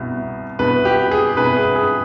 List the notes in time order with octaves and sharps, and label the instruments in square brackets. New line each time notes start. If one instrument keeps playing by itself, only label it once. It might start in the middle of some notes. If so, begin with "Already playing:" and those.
Already playing: [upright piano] C2 B2
C2 B2 B4
G4
G#4
C2 B2 B4
G#4
G#4